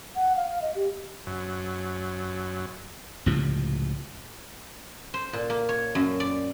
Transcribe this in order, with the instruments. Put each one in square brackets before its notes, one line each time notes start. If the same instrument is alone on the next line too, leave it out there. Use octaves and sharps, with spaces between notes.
[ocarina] F#5
F5
F5
D#5
G4
[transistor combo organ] F#2
[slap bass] C#2 A2 C3 F3
[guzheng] C5
A#2
A#3
C#5
F#2
D5